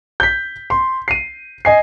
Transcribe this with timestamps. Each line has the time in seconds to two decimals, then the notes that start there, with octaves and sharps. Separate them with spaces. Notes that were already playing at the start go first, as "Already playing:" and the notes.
0.20 G6 B6
0.70 C6
1.08 C7 D#7
1.65 D#5 G#5 C7